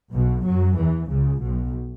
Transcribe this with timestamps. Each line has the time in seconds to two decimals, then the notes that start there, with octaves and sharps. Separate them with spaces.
0.12 B1 B2
0.45 F#2 F#3
0.77 E2 E3
1.09 C#2 C#3
1.42 B1 B2